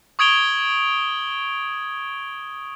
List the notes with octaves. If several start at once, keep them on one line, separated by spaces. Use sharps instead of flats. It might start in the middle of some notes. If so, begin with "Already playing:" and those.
C#6 D#6 G#6 D7 F7 G7